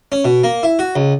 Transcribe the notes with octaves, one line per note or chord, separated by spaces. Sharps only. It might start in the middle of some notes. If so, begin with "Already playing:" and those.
C#4
B2
A#3
E4
F#4
C#2